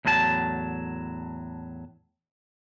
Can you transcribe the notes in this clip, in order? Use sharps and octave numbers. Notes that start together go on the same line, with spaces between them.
E2 A2 F#3 D#4 A5